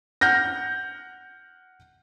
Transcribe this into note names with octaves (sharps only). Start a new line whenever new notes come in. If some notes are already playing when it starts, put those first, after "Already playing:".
F#5 F6 G6 A#6